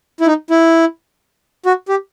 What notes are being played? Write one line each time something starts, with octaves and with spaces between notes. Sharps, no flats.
E4
D#4
E4
F#4
G4